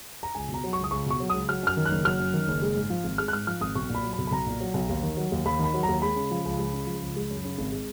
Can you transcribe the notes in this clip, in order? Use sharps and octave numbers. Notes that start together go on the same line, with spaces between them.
A#5
C#2 G#5
B2
A#5
F#3
C#2 C#6
D#6
C#2 C#6
B2 C#6
F#3
C#2 D#6
F#3 F6
F#2 F6
D#3
F#6
F#1
F#3 F6
F#2
D#3
F#1
G#3
G#2
F3
G#1
G#3 F6
F#6
G#2 F6
F3 F6
G#1 D#6
B1 C#6
A#2
B5
F#3
B5
B1
B5
B1 A#5
A#2
F#3
B1
D#2
D#3
F#3
D#2
D#2 B5
D#3 B5
F#3
D#2 A#5
G#3 B5
C#3
F3
C#2
G#3
C#3
F3
C#2
G#3
F#2
C#3
G#1
G#3